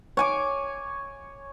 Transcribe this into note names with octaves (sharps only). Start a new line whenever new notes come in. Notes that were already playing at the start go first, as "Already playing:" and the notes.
C#5 G#5 D6